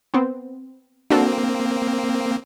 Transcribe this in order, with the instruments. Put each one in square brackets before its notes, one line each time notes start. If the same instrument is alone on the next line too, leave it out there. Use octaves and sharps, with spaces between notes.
[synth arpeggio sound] B3 C4
[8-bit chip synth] A#3 C4 [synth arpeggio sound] D4 F#4 A4